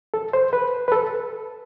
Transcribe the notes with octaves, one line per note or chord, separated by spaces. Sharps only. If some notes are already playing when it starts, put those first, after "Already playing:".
A4
C5
B4
B4
A4